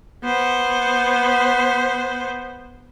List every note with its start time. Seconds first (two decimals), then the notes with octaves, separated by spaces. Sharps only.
0.24 B3 C5